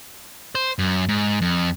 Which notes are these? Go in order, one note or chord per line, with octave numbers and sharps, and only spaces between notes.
C5
F#2
G#2
F2